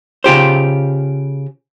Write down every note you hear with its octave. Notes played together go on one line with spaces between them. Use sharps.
C#3 F4 G4 C5